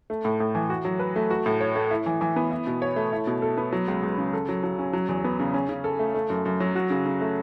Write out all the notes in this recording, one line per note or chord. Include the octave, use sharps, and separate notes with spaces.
A3
A2
A2
E3
F#4
F#3
B4
A3
F#4
A2
C#5
A3
E4
E3
E3
B3
E4
B2
C#5
A3
E4
B2
A4
B3
F#3
C#2
C#2
C#3
A4
F#3
F#3
C#4
F#3
E2
B3
C#3
C#4
C#3
A4
A3
A3
F#2
F#2
F#3
F#4
C#3
C#3
A3